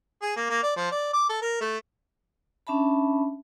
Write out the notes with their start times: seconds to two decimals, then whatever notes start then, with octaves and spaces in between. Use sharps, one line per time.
0.22 G#4
0.36 A#3
0.50 A#3
0.63 D5
0.77 F3
0.91 D5
1.13 D6
1.29 A4
1.42 A#4
1.61 A3
2.67 C#4 D4 E5 A5 B5